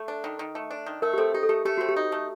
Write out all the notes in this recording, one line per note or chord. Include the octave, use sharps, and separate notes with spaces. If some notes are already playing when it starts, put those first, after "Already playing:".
Already playing: A3 A4
D4
D#3
D#3
A3
D4
D#3
A3 A#4
G4
C4 A4
D#4 G4
A4
A3 G4
A3 G4
C4 F#4
G4
D#4
A3